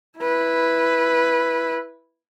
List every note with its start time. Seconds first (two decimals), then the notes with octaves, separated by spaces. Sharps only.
0.19 E4 B4